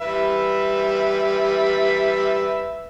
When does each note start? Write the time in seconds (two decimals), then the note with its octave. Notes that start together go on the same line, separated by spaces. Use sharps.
0.01 G3 B4 E5